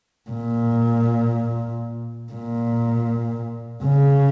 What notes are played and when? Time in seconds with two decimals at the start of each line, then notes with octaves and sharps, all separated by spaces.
0.30 A#2
2.32 A#2
3.84 C#3